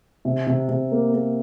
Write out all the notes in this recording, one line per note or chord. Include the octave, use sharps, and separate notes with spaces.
C3
C3
C3
A#3
A#3